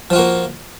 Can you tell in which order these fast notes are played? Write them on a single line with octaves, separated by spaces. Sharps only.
F3 F4 F#4 A#3